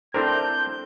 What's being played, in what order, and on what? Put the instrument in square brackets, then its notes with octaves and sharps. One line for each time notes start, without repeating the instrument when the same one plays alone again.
[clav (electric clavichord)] C4 D4 A#4 [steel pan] E4 A4 C5 [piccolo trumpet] G6